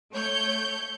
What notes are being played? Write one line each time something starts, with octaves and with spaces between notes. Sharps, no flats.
A3 C#5 G6 C#7